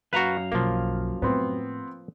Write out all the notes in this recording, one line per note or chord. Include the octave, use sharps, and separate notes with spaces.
F#2 F#4 B4 F5 A#5
B1 F3 A#3
A2 B3 C4